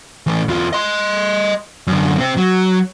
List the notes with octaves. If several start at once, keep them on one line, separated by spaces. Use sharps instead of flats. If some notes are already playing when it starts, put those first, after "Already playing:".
A2 E3
E2 F4
D#5 C6
F#2 D3
C3 C4
F#3